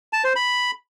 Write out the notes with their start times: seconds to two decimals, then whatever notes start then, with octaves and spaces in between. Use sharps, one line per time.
0.13 A5
0.24 C5
0.36 B5